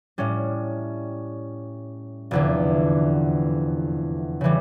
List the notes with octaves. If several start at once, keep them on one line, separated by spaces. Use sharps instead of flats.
A2 G3 C#4
F1 E2 D3
C#3 E3 G3